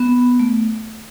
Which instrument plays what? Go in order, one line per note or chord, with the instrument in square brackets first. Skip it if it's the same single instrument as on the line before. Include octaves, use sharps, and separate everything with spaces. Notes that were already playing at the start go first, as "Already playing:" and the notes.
Already playing: [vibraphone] B3
A3